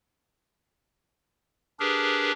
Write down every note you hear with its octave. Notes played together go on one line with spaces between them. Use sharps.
D4 G4 G#4 A#4 B4